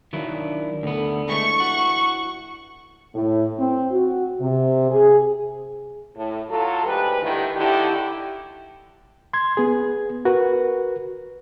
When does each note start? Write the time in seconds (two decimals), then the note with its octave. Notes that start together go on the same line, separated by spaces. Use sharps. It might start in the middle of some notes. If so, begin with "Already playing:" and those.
0.13 D#3 F#3 A#3 D4 E4
0.83 D2 D3 B3 A4
1.29 E3 G#3 A3 C#6
1.60 F#4
3.15 A2
3.59 C4
3.92 F#4
4.41 C3
4.90 G#4
6.16 A2
6.50 F#3 F4 F#4 A4
6.85 D2 G#2 G4 B4
7.21 D2 G2 D3 D#3 E4 G4
7.55 D3 A3 D#4 E4 G4
9.33 C6 G#6
9.57 B3 G#4
10.25 F#4 A#4 B4